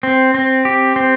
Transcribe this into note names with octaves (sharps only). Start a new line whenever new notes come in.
C4
C4
G4
C4